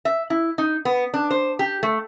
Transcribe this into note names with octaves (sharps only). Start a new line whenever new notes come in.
E5
E4
D#4
B3
D4
C5
G4
A3